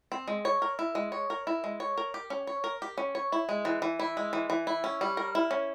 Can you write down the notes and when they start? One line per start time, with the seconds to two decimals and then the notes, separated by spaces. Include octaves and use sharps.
0.12 C4
0.28 G#3
0.45 C#5
0.62 A#4
0.79 E4
0.95 G#3
1.12 C#5
1.30 A#4
1.47 E4
1.64 G#3
1.80 C#5
1.97 A#4
2.14 G4
2.30 C#4
2.47 C#5
2.64 A#4
2.82 G4
2.98 C#4
3.15 C#5
3.32 E4
3.49 G#3
3.65 E3
3.82 E3
3.99 E4
4.17 G#3
4.33 E3
4.50 E3
4.67 E4
4.84 C#4
5.01 G3
5.17 A#4
5.35 E4
5.51 C#4